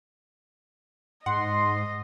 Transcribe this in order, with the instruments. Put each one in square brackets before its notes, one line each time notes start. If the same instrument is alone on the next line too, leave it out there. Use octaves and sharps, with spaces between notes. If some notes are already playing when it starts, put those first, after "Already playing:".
[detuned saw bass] G#2 [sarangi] D#5 [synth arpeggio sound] F#5 [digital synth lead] C6